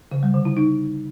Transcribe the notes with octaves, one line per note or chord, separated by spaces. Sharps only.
C#3
G3
D3
E4
D#4